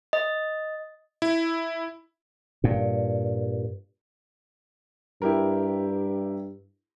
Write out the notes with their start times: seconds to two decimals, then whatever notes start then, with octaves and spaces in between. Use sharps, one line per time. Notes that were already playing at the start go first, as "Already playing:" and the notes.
0.13 D#5
1.22 E4
2.64 G2 A#2
5.22 G2 E4 G4 A#4